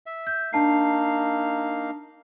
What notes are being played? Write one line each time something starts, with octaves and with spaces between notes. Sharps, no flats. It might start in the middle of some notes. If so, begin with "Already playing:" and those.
E5
G6
A#3 D4 D#4 F5 A5 C7